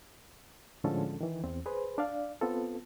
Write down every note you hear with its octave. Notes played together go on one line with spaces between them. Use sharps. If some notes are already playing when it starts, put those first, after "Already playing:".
A2 D3 F3 G#3 C#4 A4
D#3 E3
E2 C4
G#4 B4 C5
D4 D5 F5
B3 C4 F4 A4